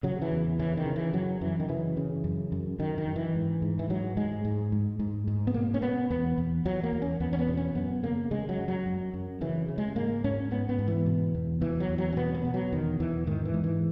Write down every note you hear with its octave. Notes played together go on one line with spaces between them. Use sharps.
C#3 F#3
E3
E2
C#3 E3
D#3
C#3
E3
F#2 F#3
F#2 E3
D#3
C#3 E3
C#3
F#2
F#2
F#2 D#3
D#3
F#2
E3
G#2
G#2
E3
G#2 F#3
G#2 G#3
G#2
G#2
G#2
G#2
B3
B2 A#3
C#4
B2 B3
E2 B3
E2
E2 F#3
A#3
E2
C#4
E2 B3
C#4
B3
B2
C#4
F#2 B3
C#3 A#3
C#3 G#3
F#3
F#2
F#3
F#2
F#2
C#3 E3
C#3
G#3
G#2 A#3
G#2 C#4
G#2 B3
B3
G#2
E3
B2
E2
B2 E3
F#3
E2
F#3
C#4
B2 B3
B3
B2
F#3
E2 D#3
E2 E3
G#2 D#3
E3
G#2
E3